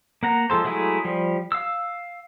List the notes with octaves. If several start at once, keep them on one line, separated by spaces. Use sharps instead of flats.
A#3 F#5 A#5
F3 G#3 A4 C5
F#3 G#3 A3 E4 G#4
F3 G3
F5 E6